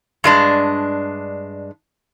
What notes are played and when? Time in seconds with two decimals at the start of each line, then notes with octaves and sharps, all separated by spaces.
0.24 G2 G#3 D4